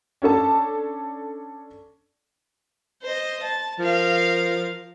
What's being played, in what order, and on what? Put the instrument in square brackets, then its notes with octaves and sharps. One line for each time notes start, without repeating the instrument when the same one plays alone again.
[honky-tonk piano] C#4 D4 A4 A5
[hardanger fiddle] C5 D#5
A5
[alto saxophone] F3 [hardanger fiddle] A#4 F5